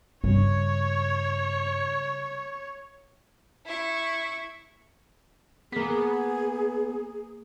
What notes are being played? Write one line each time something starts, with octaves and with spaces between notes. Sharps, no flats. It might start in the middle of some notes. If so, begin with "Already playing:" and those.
G2 C#3 G3 C#5
E4 C#6
A#3 B3 G#4 B6